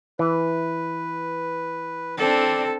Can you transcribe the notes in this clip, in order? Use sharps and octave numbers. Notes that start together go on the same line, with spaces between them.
E3 B4
C4 D4 A4 D5